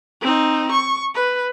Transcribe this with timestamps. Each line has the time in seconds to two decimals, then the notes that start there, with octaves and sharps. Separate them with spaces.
0.22 C4 D#4
0.71 C#6
1.15 B4